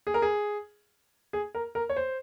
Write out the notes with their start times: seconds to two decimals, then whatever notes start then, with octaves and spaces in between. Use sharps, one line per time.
0.07 G#4
0.14 A#4
0.22 G#4
1.33 G#4
1.55 A#4
1.75 A#4
1.90 C#5
1.96 C5